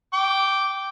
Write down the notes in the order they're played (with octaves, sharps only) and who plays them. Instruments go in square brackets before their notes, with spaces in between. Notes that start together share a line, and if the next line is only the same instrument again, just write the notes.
[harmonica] G5 D6